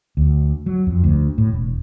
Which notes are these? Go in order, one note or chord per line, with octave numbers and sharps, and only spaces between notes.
D2
F#3
F2
D2
A2
E1